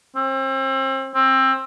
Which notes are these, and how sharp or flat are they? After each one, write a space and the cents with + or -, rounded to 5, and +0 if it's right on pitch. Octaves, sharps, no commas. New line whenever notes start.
C4 +35
C4 +20